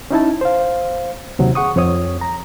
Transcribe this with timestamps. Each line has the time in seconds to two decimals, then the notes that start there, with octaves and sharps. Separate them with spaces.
0.11 C#4 D#4 E4 A5
0.41 C5 F5
1.39 D#2 C3 F#3
1.55 G#4 F#5 C#6 D#6
1.76 F2 C4 C#5 D#6
2.21 A#5